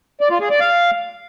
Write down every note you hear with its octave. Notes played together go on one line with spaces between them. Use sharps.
D5
F4
G#4
D5
F5